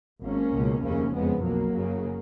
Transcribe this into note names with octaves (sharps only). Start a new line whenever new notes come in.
G#1 G#2 A#3 C#4
C#2 B2
F1 D#2 C#3 A#3 C#4
F#1 F2 C#3 G#3 B3
B1 B2 F#3 A#3
F#1 F#2 C#3